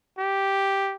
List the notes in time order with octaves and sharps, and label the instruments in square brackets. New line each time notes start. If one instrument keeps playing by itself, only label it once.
[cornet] G4